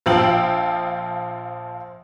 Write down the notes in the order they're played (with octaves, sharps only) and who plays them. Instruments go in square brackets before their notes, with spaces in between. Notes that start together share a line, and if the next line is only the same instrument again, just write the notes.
[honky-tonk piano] A#1 F3 F4 G5 E6 F#7